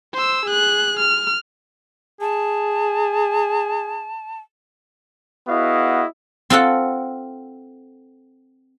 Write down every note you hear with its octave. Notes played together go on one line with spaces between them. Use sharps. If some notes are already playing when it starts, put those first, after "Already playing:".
C5 E6
G#4 F#6
F6
G#4 A5
B3 E4 F#4 G#4 D#5 F5
C4 F4 A4 F#5